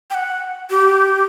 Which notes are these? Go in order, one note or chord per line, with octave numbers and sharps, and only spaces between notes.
G5
F#5
G4